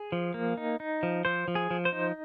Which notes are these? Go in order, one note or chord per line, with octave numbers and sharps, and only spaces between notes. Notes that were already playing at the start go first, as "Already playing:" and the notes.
Already playing: G#4
F3
A#3
D#4
D#4
F3
F3 C5
F3
G#4
F3
C5
D#4